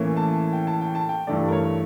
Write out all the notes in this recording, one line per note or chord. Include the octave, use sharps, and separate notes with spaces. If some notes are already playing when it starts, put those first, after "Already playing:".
Already playing: A2 E3 A#3 C#4
A5
G5
A5
G5
A5
G5
G2 E3 A3 D5
A#4
C#5